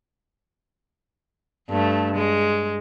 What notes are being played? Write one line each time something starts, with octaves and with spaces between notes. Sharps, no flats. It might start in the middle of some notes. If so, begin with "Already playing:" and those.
G2 A3
G#3